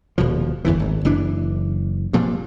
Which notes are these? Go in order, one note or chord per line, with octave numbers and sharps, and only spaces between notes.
D#1 B2 F3
G1 E2 G#2 E3
G#1
F#1 E3 D4
G2 A#2 F3